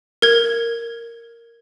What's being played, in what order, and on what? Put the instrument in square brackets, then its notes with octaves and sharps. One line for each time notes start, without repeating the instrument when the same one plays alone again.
[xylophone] A#4 G#6